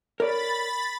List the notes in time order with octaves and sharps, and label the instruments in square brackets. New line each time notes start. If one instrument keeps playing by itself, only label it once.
[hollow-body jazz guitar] A#4 C#5 D5 [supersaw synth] B5 A6